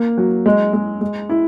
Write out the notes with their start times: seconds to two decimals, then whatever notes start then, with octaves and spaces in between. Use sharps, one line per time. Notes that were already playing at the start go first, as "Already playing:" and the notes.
Already playing: A#3
0.17 F#3
0.46 G#3
0.73 G#3
1.01 G#3
1.29 E4